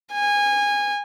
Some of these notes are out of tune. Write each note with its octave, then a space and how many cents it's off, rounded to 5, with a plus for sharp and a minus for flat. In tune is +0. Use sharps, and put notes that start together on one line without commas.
G#5 -20